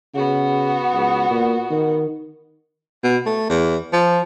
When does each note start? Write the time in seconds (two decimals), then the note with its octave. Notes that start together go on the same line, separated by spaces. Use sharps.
0.15 C#3 B3 F#4
0.94 C#2
1.30 A#2
1.71 D#3
3.04 B2
3.26 A3
3.49 E2
3.93 F3